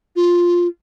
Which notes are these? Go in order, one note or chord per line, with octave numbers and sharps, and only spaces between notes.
F4